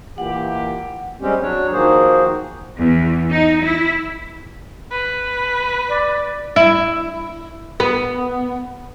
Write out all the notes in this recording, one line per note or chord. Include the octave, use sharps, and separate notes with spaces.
A#2 E3 G4 F#5
G3 G#3 C4 C#4 G4
F#3 D4 C#5
D#3 F3 A#3 F#4 G#4 C5
E2
D#4
E4
B4
D5
E4
B3